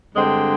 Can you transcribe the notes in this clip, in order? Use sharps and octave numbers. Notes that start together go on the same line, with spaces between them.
G2 D3 G#3 C4 C5 D#5